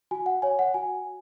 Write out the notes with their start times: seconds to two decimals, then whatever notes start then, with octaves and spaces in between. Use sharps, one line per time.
0.11 F#4 G#5
0.26 F#5
0.42 C#5 G#5
0.59 F#5
0.74 F#4 G#5